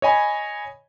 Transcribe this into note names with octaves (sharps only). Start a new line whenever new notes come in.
C#5 D#5 G#5 B5